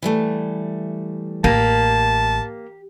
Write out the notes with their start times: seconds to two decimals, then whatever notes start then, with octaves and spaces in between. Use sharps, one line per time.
0.02 E3 G3 A3
1.44 A1 A#3 G4 A5